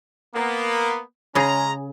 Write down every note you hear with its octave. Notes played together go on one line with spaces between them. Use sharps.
A#3 B3
C#3 G#3 C#4 G#4 A#5